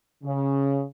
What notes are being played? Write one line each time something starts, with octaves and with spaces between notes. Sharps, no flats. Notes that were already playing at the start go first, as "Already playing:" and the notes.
C#3